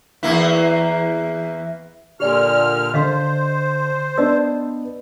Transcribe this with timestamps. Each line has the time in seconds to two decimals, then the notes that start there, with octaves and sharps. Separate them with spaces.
0.23 E2 A#3 E4
2.20 A#2 D3 G4 D5 G#5 F6
2.94 D3 C5 D#5 F5 C6
4.18 B3 D4 D5 D#5 E6